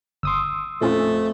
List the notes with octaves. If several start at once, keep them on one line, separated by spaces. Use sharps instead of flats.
G1 C6 D#6 E6
F2 A#2 A3 C#4 F4